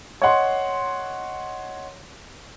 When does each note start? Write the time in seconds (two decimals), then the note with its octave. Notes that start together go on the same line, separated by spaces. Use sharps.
0.22 C#5 D#5 F#5 C6